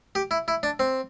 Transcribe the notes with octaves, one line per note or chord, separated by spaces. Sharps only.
G4
E4
E4
D4
C4